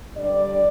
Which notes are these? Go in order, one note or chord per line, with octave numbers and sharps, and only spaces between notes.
G2 D3 G3 D4 D5